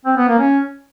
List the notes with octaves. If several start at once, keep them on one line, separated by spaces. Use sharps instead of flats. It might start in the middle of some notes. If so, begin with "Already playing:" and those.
C4
B3
A#3
C#4